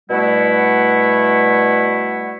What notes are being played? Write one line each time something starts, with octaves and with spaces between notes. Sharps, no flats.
B2 G3 A3 E4 F#5